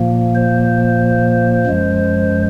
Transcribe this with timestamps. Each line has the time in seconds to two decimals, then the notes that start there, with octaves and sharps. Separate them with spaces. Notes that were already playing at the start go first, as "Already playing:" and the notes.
Already playing: A#2 F3 A#3
0.35 C5
1.66 F#2 F3 G#3